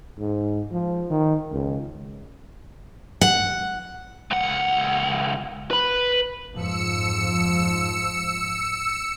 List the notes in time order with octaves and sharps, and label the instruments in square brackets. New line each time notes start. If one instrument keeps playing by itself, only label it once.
[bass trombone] G#2
F3
D#3
C#2
[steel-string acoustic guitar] F#5
[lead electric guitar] C#2 F#5
B4 B5
[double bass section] F2 G#2 F3 [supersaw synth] E6 C#7